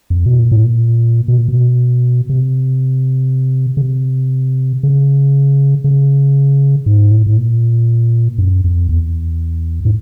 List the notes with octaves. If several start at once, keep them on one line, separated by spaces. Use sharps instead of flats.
F2
B2
A#2
A2
A#2
B2
A#2
B2
C3
C#3
C3
C#3
C#3
G#2
A2
A2
A#2
F#2
F2
E2
A2